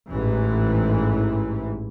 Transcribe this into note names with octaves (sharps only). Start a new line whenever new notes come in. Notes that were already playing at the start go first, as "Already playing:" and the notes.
A1 G#2 E3